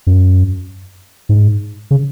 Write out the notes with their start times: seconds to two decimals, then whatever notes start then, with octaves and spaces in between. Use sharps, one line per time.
0.07 F#2
1.29 G#2
1.91 C#3